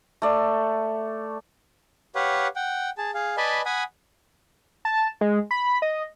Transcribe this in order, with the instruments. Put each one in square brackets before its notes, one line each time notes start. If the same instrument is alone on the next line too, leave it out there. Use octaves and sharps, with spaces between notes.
[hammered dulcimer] A3 D5
[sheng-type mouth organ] G4 B4 C#5 F5 F#5
F#5 G5
G#4 A5
G#4 F5
B4 D5 D#5 G#5 A5 B5
F#5 G#5 B5 D#6
[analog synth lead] A5
G#3
B5
D#5